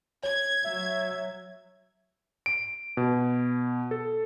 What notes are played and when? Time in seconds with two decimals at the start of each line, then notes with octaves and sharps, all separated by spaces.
0.23 C#5 G#6
0.64 F#3 E5
2.46 D7
2.97 B2
3.91 A4